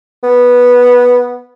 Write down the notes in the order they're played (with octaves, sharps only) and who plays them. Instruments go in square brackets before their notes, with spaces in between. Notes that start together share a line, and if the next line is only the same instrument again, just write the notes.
[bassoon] B3